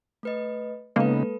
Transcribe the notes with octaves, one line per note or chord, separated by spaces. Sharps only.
A3 B4 D#5
C#3 G#3 A#3 B3 D#4 A4 B4